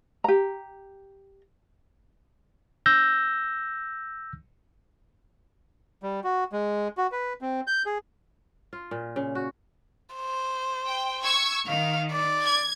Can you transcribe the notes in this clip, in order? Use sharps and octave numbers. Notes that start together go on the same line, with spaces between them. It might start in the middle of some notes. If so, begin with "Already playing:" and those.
G4 A#5
E6 G6 A#6
G3
F#4
G#3
F#4
B4
C4
G6
G#4
F4
A#2
C#3
F#4
C5
G5
C#6 E6 G#6
D#3 F5
D5
G#6